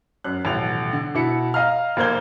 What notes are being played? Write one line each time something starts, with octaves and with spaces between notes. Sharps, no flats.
F#2 F#6
D#1 A1 B2 F#3 F7
D3
B2 E4 C#7
D#5 F5 A#5 F6
F1 A#3 C5 G#6 G7